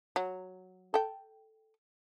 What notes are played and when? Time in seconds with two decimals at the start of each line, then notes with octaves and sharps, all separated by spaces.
0.16 F#3
0.94 A4 G5